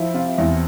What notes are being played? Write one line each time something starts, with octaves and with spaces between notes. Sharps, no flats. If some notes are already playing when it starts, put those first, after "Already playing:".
Already playing: F3 E4
C3 F4
E2 E4